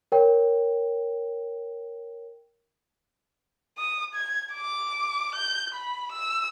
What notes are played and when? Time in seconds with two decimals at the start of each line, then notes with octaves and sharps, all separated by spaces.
0.12 A#4 C#5 G5
3.78 D#6
4.15 G#6
4.53 D6
5.35 G6
5.75 B5
6.12 E6